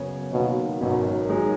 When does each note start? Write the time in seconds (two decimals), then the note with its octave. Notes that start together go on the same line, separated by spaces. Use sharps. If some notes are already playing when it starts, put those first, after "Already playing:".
Already playing: F#2 C#3 B3 F#4 C#5
0.33 D#2 B2 D#3 F#3
0.81 G#1 F#2 B2 D#3 F#3 C#4
1.29 F#2 D#3 G#3 D#4 G#4